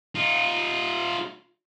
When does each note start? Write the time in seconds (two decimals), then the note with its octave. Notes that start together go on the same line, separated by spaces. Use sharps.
0.15 D#4 F4